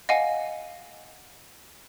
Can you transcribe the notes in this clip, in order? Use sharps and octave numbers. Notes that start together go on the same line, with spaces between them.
D#5 F5 F#5 G#5